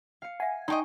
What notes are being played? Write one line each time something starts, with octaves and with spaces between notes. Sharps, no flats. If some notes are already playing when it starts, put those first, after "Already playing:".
F5 C#7
E5 F#5 G#5
D#4 D5 D#5 G5 A5 C6 C#6